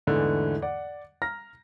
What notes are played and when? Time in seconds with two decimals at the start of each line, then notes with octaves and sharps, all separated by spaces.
0.07 E2 G#2 D3 E3 A3
0.62 D5 F#5
1.22 A#5 F6 A#6